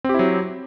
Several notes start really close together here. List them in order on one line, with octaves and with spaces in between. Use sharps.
C4 G4 E4 F#3